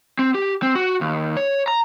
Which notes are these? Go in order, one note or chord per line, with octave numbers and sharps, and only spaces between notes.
C4
G4
C4
F#4
D#2
C#5
A#5